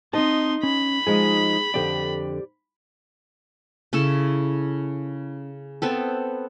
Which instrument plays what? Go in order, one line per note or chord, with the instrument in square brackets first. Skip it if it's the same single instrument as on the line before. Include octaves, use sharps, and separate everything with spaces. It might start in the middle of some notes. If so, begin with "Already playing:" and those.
[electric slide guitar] C4 A5 [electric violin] D#4 C6 [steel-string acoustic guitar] D#5
[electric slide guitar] C#4 [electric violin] B5
[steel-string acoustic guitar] F3 G#3 D#4 [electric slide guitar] G#4
[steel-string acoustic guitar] F2 D3 [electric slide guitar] G4 D5
[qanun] C#3 C#4 E4 A4
B3 C4 A4